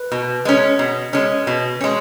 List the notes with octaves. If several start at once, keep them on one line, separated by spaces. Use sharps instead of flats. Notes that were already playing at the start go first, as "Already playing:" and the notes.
Already playing: B4
B2
G#3 C#4
B2
G#3 C#4
B2
G#3 C#4